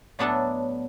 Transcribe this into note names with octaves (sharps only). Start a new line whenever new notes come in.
A2 F#3 B3 D4 A4